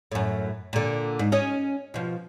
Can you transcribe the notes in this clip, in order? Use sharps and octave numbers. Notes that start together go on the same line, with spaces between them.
F#2 A2
A#2 D3
G#2
C#4 D#5
B2 F3